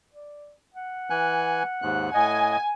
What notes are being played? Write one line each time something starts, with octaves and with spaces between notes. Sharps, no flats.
D5
F#5
E3 G#5 F#6
D#2 G#2 F#6
A2 D#5 G#5